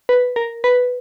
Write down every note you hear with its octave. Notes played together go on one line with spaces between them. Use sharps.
B4
A#4
B4